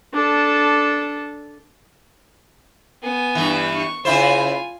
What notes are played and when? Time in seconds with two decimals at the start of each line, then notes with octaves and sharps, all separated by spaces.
0.14 D4 A4
3.03 B3 G#5
3.35 G2 E3
3.74 C#6
4.05 C#3 E4 F4 C5 G#5